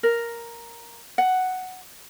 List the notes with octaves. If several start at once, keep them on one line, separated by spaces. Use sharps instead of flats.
A#4
F#5